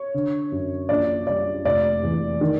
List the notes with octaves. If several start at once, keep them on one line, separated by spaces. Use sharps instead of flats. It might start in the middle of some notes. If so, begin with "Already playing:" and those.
Already playing: C#5
D3
F#2
A#1 D5
G3 D5
F1 D5
E2
D#3